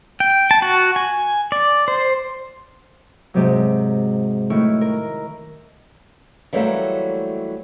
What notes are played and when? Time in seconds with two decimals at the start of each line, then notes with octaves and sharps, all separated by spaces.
0.20 G5
0.51 A5
0.62 F#4
0.96 G#5
1.52 D5
1.88 C5
3.34 G#2 C3 F#3
4.50 A2 D#3 E4 C#6
4.81 A#4
6.53 E3 F#3 G3 A3 A#3 C4